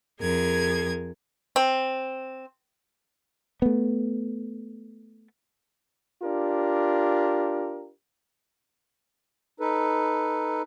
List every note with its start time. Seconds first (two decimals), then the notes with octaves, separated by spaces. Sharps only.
0.21 F2 G#4 A#4 G#6
1.56 C4
3.62 A3 B3
6.22 D4 F4 G4 A#4
9.60 D#4 A4 B4